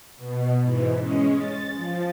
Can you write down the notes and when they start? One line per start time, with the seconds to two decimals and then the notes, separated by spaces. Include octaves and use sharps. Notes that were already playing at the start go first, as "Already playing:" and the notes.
0.17 B2
0.62 G#2 E3
0.98 G#3 C#4
1.33 A6
1.74 F3